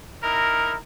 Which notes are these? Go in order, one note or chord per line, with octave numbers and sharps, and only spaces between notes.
D#4 E4 A#4